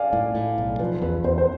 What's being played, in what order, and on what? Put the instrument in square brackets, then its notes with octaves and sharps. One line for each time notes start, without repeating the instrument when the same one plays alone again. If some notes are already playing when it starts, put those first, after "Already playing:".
Already playing: [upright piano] D5 F5 G#5
[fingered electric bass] A2
A2
B1
[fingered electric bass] F3 [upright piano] B4
[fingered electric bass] E2 [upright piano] B4
[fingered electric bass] E2 [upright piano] C5
[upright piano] C5